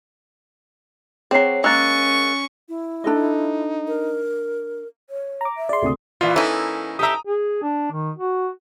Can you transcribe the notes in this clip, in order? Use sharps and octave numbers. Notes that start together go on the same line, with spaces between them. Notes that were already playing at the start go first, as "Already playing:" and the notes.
F#3 C4 G#4 C#5 C7
G#3 A#3 C#4 C#6 E6 F#6 A6
E4
D4 D#4 A4 D#5
A#4
C#5
A#5 D6
E5
G#4 D5 C6
D2 C3 D#6
A#2 E3 F4
E3 A#3 C#4 D#4 E4 A4
G4 A4 E5 A#5 D#6
G#4
D4
D#3
F#4